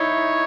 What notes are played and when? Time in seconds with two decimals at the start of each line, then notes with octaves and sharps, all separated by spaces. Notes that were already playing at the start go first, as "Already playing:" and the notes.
Already playing: D#4 E4 C#5